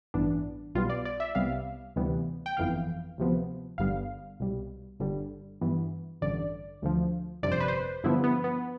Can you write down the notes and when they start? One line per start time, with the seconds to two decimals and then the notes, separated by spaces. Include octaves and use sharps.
0.14 A1 G2 E3 B3 D4
0.75 B1 B2 G3 B3 F4
0.90 D5
1.05 D5
1.20 E5
1.35 C2 C3 G3 B3 F5
1.96 D2 C3 E3 G3 B3
2.46 G5
2.57 G1 F2 E3 B3 F5
3.18 D2 C3 F3 B3
3.78 G1 G2 D3 G3 B3 F5
4.40 C2 B2 G3
5.00 G1 G2 D3 G3
5.61 G2 E3 B3
6.21 A1 G2 D3 D5
6.82 D2 D3 F3
7.43 G1 F2 C3 D5
7.52 C5
7.60 B4
7.68 C5
8.04 G2 D3 F3 B3 E4
8.24 B3
8.44 B3